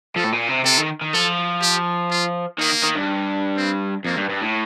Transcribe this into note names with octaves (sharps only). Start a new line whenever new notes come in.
F3 A4
A2
A#2
C3
C3 A4
D#3
D#3
F3 A4
G4
F4
D#3 A#3
D#3
G2
C4
F2 A#3
G2
G2
A2